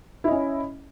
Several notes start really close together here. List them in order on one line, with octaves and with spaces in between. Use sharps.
E4 D#5 C#4